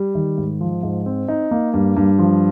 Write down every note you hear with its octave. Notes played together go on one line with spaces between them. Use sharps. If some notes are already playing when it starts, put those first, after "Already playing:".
Already playing: G3
D#3
G#2
F3
G#2
C4
D#4
A#3
G2
G2
F3